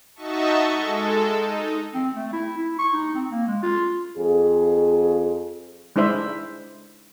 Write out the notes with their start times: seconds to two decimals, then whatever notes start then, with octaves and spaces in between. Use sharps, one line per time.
0.15 D#4 F#4 D#5 E5 A5 C#6
0.72 G#3 A4
1.36 D#4
1.94 C4
2.15 A3
2.33 E4
2.58 E4
2.79 C#6
2.93 D#4
3.15 C4
3.31 A#3
3.47 G#3
3.63 F4
4.18 F2 G#4
5.96 G#3 D4 E4 C5 E5